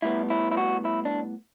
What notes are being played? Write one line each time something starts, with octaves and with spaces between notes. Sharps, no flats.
A2 G3 B3 E4
E4
E4
F#4
E4
D4